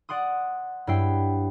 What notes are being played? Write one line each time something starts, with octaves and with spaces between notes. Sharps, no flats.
D5 F#5 C6 D#6
G2 F#3 E4 E5 G5 C7